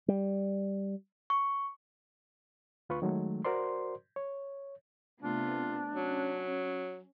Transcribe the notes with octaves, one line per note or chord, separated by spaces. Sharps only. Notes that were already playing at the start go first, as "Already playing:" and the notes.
G3
C#6
D2 F4 B4 C#6
D#3 F#3 G#3 A3
F#4 A#4 C5 D5 C6
C#5
C3 A3 B3 D4 F4
F#3 C#4